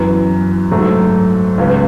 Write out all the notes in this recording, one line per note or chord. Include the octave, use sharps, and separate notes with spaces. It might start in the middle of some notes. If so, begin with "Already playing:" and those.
Already playing: F#2 E3 B3
G#2 F#3 A3
C#2 C#3 G#3 B3